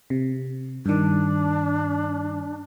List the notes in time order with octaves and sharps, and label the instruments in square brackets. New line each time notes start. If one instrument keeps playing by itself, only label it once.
[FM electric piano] C3
[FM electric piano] G2 D#3 [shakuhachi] D4